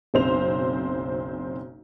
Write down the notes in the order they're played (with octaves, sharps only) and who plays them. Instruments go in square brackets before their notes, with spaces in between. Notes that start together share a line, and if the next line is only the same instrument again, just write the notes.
[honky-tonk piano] F#1 B1 C4 C5 F7